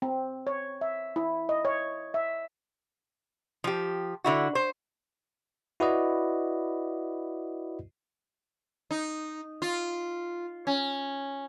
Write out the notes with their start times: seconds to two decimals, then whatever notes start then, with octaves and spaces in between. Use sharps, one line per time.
0.02 C4
0.47 C#5
0.81 E5
1.16 E4
1.49 D#5
1.65 C#5
2.14 E5
3.64 F3 G4
4.24 D3 E4 F#4
4.55 C5
5.80 E4 F#4 B4 D5 D#5
8.91 D#4
9.62 F4
10.67 C#4